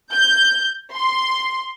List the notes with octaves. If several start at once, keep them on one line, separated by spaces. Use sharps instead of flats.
G6
C6